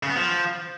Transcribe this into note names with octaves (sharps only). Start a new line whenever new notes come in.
C#3
B3
F3